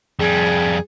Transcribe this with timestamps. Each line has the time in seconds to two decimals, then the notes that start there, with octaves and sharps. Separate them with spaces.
0.19 F2 G3 G#4